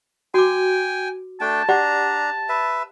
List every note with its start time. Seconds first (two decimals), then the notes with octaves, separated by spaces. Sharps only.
0.34 F#4 G5 G#5 D6
1.41 A3 D4 G5 A5
1.69 D4 G4 D5 F#5 A#5
2.49 B4 E5